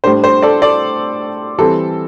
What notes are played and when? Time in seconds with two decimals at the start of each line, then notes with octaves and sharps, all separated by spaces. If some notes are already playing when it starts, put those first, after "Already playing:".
0.04 A2 G3 D4 C5
0.24 C5
0.43 A4 D5
0.62 A4 D5
1.58 E3 G3 C4 A4